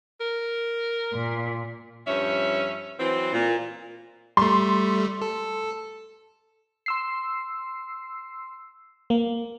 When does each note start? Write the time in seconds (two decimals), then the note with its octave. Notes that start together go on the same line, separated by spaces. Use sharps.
0.21 A#4
1.12 A#2
2.07 G2 F3 C#4 C#5 E5
2.99 E3 F#3 C4
3.33 A#2
4.37 G3 A3 C6
5.22 A4
6.86 C6 E6 C7
9.10 A#3